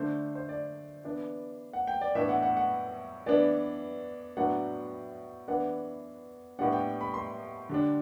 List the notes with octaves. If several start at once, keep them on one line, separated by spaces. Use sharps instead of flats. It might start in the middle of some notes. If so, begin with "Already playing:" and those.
Already playing: D3 A3 D4 C5
C5
D5
E3 B3 D4
F#5
G5
D5
A2 E3 B3 D4 E5
F#5
F#5
F#5
E3 B3 D4 D5
A2 F#3 B3 D4 F#5
E3 B3 D4 F#5
A2 G3 B3 D4 F#5
G5
B5
C6
D3 G3 D4